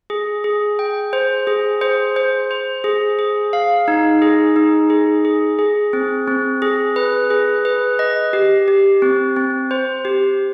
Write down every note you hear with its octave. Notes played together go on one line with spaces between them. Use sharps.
G#4
G#4
G5
C5
G#4
C5
C5
C5
G#4
G#4
F5
D#4
G#4
D#4
G#4
G#4
G#4
C4
C4
G#4
B4
G#4
B4
D#5
G4
G4
C4
C4
C5
G4